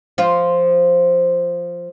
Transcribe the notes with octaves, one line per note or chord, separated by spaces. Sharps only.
F3 F4